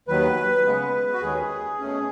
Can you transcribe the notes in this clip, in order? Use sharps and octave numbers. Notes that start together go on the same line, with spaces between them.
D#2 D#3 F#3 B4
C#3 G#3 B3
F#4
D#2 D#3 G#3 C#4 G#4
B2 A3 C#4